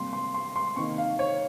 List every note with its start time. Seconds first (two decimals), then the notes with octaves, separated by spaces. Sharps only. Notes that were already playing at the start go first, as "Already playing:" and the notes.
Already playing: C3 G3 A#3 C6
0.13 C6
0.34 C6
0.56 C6
0.76 C3 D#3 A#3 C#6
0.98 F5
1.19 C#5